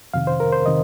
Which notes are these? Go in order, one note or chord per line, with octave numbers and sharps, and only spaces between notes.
F2 C3 D#3 F5
C5
A#4
C5
C3 D#3 D#5